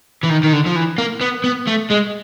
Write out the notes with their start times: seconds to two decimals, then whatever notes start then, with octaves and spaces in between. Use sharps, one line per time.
0.23 E3
0.29 D#3
0.43 D#3
0.53 D3
0.66 F3
0.76 E3
0.98 A#3
1.21 B3
1.44 B3
1.67 A3
1.90 G#3